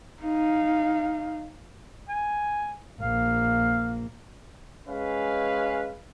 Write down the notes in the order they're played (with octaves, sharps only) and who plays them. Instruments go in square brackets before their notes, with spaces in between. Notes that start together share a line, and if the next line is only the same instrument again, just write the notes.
[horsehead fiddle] D#4 F5
[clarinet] G#5
[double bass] A#1 A#3 [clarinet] F5
[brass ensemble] G#3 C#4 B4 F5